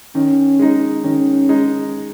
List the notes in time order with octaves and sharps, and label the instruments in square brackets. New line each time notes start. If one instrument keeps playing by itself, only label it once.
[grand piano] D#3 [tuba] C#4
[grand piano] G#3 D#4
[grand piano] D#3 [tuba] C#4
[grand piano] G#3 D#4